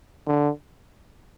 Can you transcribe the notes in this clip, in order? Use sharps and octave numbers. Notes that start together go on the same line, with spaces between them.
D3